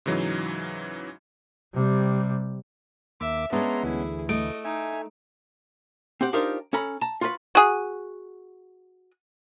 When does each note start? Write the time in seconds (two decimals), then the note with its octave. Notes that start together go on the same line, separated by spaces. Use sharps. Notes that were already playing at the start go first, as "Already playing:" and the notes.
0.06 G#2 C#3 E3 F#3 D#4
1.74 C3 G3
3.21 D#2 A#3 E5 D6
3.53 G#3 B3 C#4 D4 E5 A#5 C6
3.83 D2 E3 E4 G#4
4.29 A3 D#5 D7
4.65 D#4 E5 G#5
6.21 C4 G4 F#5
6.33 D4 D#4 F4 G4 A#4 C5
6.73 C#4 A4 A#5 B5
7.01 A5 A#5
7.21 F4 F#4 A4 B4
7.55 F#4 G#4